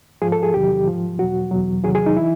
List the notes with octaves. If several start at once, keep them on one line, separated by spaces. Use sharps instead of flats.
G#2 F3 G#4
A4
G#4
E2 C3 D#3 F#3 G4
G#2 F3
E2 B2 F#3 F#4
E2 B2 F#3
E2 C3 D#3 F#3 G#4
G#4
D#4
E3 E4